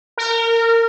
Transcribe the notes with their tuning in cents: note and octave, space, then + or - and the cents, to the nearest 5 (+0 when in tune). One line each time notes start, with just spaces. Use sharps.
A#4 -25